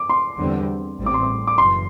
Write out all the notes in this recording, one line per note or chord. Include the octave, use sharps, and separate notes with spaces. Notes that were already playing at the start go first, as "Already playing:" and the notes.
Already playing: D6
C6
E2 D3 G3 C4
A1 A2 G3 C4
D6
C6
D6
D6
F#1 F#2 E3 C6